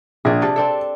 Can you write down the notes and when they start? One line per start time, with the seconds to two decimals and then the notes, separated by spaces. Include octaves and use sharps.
0.25 A#1 G#4 D5
0.42 C3 A5
0.56 C4 D4 A4